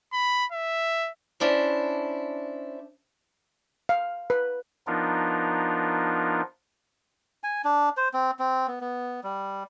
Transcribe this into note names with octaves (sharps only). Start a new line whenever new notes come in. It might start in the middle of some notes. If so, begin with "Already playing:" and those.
B5
E5
C#4 D4 E4 C5
F5
B4
F3 B3 D4 D#4 F4 A#4
G#5
D4
C5
C4
C4
B3
B3
G3